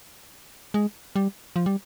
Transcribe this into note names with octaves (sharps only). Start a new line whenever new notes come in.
G#3
G3
F3
G3